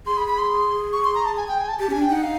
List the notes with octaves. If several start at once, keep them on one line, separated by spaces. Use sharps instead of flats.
G#4 C6
B5
B5
C6
C#6
C6
A#5
A5
G#5
G5
G#5
A5
G4 A5
C#4 G#5
D4
G5
D#4 F#5
F5